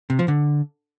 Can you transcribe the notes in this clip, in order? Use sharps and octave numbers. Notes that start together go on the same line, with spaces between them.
C3
F3
D3